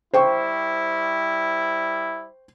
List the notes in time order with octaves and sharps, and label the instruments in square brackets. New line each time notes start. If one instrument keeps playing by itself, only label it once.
[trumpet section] G3 E4 [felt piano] C5 G5 C#6